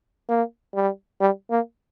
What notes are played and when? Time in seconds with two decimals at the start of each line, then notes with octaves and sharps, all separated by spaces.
0.29 A#3
0.74 G3
1.21 G3
1.51 A#3